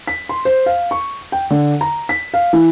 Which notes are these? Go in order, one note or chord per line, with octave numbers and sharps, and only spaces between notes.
B6
C6
C5
F5
C#6
G5
D3
A#5
B6
F5
E3